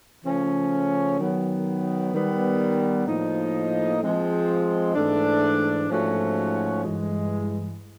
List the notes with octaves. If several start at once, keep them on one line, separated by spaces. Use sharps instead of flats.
C#3 F3 A3 C#4
D#3 F#3 B3
D#3 G3 B3
A2 F3 A#3 D#4
F3 G#3 C4
G#2 E3 A3 D4
G#2 F3 A3 C#4 F#4
G2 E3 G#3